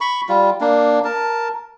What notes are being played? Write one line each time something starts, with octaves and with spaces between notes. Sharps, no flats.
B5 C#6
G3 F4
A#3 D4
A#4 A5